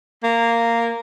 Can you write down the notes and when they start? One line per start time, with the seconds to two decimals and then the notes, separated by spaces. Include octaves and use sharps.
0.24 A#3